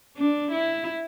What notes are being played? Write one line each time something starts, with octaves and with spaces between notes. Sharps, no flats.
D4
E4